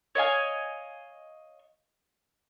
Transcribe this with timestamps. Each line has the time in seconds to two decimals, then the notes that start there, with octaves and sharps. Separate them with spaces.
0.15 C#5 D#5 F5 G#5